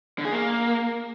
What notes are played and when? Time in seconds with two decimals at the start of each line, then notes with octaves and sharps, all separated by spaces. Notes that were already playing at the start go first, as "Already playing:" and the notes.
0.18 D3
0.25 G#4
0.32 A#3